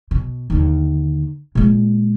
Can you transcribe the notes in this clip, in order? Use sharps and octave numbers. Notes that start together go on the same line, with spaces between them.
B2
D#2 D3
A#2 G#3